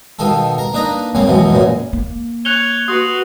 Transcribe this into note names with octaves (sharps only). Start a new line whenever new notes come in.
B2 D#3 F4 A4
A#4
A#3 D4 D#4 B4 D#5 A#5
C#3 F#3 A#3 C4
C#2 F#2 B2 E3 F#3
F#2 A#2 C#3
A#3
C#5 F#6 F7 G7
F#4 B4 C6 D#6